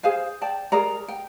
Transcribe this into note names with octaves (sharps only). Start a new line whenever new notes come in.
G#4 C5 F5 G#5
D5 G5 A5
G#4 A#4 D5 A#5
G5